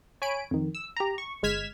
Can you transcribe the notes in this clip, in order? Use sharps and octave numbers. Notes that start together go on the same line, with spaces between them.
C#5 G#5 B5 D7
F2 D#3
E6
G4 A#5
C#6
G1 G#3 F6 G#6 B6 E7